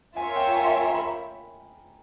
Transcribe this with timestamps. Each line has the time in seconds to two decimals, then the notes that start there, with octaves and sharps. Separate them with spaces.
0.17 F4 A#4 C#5 E5 G#5
0.36 G5
0.56 G#5
0.69 G#5
0.82 A#5
0.95 B5